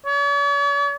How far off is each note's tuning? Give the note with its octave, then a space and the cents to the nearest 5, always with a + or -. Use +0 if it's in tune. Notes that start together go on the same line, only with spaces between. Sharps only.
C#5 +45